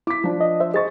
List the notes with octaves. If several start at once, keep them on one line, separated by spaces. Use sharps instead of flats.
E4 D6 B6
F3 D4
D#5
C5 E5
G#4 C5 D#5 C#6 A6